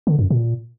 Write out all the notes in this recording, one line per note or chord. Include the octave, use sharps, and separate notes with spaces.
D3
F#2
A#2